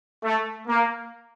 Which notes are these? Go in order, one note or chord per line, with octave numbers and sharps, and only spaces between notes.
A3
A#3